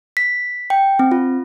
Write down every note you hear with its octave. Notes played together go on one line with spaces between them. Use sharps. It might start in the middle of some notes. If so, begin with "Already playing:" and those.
B6
G5
C4
F4